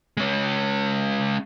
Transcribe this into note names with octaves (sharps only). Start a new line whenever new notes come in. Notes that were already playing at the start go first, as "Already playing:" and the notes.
G#3 C#4